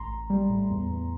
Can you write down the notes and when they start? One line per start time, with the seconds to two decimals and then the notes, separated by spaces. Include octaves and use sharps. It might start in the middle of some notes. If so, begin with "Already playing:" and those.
Already playing: A1 A#5 C6
0.11 A1
0.30 G3
0.49 A2
0.70 E2
0.88 E2